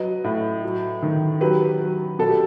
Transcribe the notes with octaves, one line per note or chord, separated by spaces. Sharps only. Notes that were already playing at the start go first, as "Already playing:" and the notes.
Already playing: F#3 B4 D#5
A2
F#3
D#3
F#3 G4 B4
F#3
B2 A4
G4